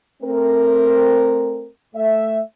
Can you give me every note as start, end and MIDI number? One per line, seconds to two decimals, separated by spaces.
0.23 1.68 57
0.23 1.68 60
0.23 1.68 70
1.95 2.41 57
1.95 2.41 76